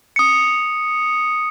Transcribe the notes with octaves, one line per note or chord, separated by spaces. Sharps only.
D#6 C#7